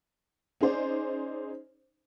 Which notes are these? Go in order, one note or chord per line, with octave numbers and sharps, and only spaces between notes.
C#4 D#4 G#4 C5 D5